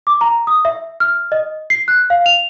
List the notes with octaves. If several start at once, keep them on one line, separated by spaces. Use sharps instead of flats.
D6
A#5
D#6
E5
F6
D#5
C7
F#6
F5
F7